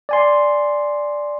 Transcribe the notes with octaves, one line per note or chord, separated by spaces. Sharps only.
D5 G#5 C6